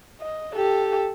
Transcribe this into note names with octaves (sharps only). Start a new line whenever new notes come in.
D#5
G4 A4